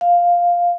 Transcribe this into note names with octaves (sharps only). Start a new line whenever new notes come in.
F5